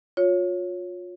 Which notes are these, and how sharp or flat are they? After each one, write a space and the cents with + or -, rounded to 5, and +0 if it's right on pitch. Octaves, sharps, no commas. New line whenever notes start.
F4 +30 C#5 +0